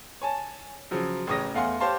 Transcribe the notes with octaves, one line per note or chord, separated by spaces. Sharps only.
C#5 G#5 A5
C#3 F3 F#3
A1 C#3 C#5 D#6 A#6
E2 A3 F5 F#5 G#5 C6
G4 C5 C#5 F5 A5 C6